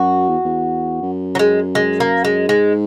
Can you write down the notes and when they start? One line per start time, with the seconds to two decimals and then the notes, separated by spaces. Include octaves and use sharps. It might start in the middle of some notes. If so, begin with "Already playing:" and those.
Already playing: F#2 F#4
0.29 E2
0.45 E2
1.02 F#2
1.35 F#3
1.39 G#3
1.75 G#3
2.00 A#3
2.25 G#3
2.49 G#2 G#3